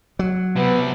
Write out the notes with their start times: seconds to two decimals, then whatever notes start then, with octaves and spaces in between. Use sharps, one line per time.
0.19 F#3
0.56 C3 B3 E4